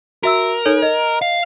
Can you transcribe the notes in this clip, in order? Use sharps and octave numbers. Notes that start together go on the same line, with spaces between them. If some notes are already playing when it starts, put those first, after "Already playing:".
F#4 A#4 E5 E6
D#4 A4 C#5
D#5
F5